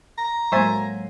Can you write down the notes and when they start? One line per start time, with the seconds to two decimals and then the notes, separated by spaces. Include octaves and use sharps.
0.18 A#5
0.52 A2 F#3 G#3 A#3 C5 E5 G#5 A6